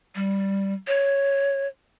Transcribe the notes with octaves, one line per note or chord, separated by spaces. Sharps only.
G3
C#5